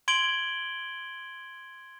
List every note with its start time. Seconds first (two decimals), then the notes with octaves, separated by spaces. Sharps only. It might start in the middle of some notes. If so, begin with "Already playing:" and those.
0.08 C6 G#6 D7 F#7 G7